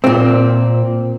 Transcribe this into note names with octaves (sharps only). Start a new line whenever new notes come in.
A#2 C4